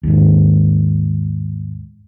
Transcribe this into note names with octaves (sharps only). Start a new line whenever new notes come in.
D#2 G#2